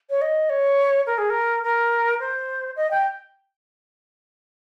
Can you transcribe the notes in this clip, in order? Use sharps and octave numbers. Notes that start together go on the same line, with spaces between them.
C#5
D#5
C#5
A#4
G#4
A#4
A#4
C5
D#5
G5